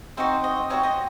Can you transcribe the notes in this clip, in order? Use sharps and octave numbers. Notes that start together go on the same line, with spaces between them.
C4 D#4 F#4 C5
D#5
C4 D#4 F#4 C#5
D#5